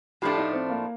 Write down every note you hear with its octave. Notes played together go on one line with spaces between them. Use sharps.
A2 F3 A3 D4 G4
D#4
C4
A#3